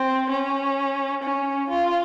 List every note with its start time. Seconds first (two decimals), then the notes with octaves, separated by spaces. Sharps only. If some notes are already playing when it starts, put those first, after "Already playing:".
Already playing: C4
0.30 C#4
1.23 C#4
1.70 F4